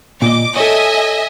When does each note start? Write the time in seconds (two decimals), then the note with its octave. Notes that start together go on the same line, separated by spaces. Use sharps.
0.22 A#2 D#5 D6
0.56 A4 C#5 D#5 E5 G#5